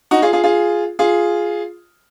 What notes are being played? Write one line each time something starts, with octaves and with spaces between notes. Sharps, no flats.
D#4 F#4
F4 G#4
F4 G#4
F4 G#4
F4 G#4